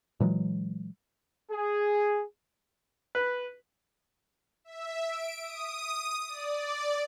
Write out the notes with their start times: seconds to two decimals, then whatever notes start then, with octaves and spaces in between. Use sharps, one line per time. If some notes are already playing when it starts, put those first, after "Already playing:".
0.20 A#2 E3 F#3 G#3
1.50 G#4
3.15 B4
4.64 E5
5.08 D7
5.42 D#6
6.28 D5